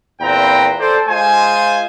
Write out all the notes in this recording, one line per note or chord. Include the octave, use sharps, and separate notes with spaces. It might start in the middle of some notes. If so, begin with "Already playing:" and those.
E2 A#2 C4 B4 G5 A#5
A4 C5 D5
G#3 F4 C5 G#5